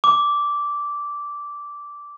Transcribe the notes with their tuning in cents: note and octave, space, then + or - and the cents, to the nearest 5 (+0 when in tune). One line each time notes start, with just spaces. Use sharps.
D6 -10